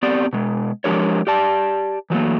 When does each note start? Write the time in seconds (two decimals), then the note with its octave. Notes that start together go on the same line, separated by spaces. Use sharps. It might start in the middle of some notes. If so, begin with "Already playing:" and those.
0.03 B3 C4 G4 D5
0.33 B2 G#3
0.84 F3 G#3 D4 G4 A#4 C#5
1.27 G4 D5 A5
2.10 E3 F#3 A3 A#3